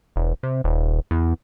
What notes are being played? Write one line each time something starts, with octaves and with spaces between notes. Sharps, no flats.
E1
C3
D#1
E2